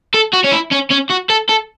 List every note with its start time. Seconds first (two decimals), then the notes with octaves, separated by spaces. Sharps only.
0.15 A4
0.34 F#4
0.45 C#4
0.52 E4
0.72 C#4
0.91 C#4
1.10 F#4
1.30 A4
1.49 A4